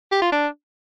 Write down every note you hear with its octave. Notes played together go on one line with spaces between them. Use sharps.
G4
F4
D4